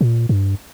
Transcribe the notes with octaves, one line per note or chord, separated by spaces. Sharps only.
A#2
G2